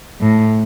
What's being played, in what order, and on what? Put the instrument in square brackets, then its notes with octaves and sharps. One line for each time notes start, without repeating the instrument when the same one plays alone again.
[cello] A2